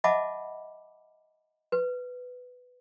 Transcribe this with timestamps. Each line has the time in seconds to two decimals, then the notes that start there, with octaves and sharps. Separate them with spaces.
0.04 D#5 E5 F#5 A5 B5 D6
1.72 B4